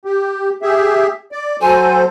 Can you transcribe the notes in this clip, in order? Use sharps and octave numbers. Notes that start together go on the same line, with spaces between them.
G4
G4 G#4 E5
D5
F#3 A4 C5 G#5